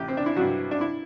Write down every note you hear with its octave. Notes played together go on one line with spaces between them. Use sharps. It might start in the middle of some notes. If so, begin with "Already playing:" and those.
Already playing: A1 G4
C4
D4
E4
G2 F#3 F#4
D4
E4